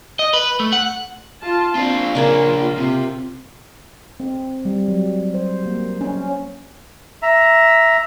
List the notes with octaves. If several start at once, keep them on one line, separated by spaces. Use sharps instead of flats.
D#5
B4
A3
F#5
F4 A5
C4 D4 F4
A#2 C#3 A#3 D4 F4 G#5
C3
C4
G3
F#3
C5
A#3
C#4
E5 A#5